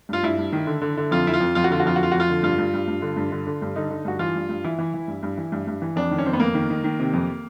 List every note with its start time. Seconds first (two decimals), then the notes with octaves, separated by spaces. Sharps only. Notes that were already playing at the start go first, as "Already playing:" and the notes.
0.09 G2 F4
0.23 G2 E4
0.38 G2
0.52 D#3
0.67 D3
0.82 D3
0.97 D3
1.11 F2 F4
1.26 F2 E4
1.34 F4
1.40 F2
1.55 F2 F4
1.64 F#4
1.71 D3 F4
1.80 F#4
1.86 F2 F4
1.96 F#4
1.99 F2 F4
2.12 F2 F#4
2.20 F4
2.30 D3
2.43 G2 F4
2.58 G2
2.74 G2
2.88 G2
3.02 D3
3.17 G2
3.32 D3
3.47 D3
3.62 G2
3.76 D3 D#4
3.90 D3
4.05 G2 F#4
4.19 E3 F4
4.35 G2
4.49 G2
4.64 E3 E4
4.78 E3
4.94 E3
5.08 G2
5.23 G2
5.38 E3
5.52 G2
5.67 G2
5.82 E3
5.96 F2 D4
6.11 D#3
6.18 C#4
6.26 F2 C4
6.33 B3
6.40 F2 A#3
6.54 D#3
6.70 D#3
6.84 D#3
7.00 C3
7.13 F2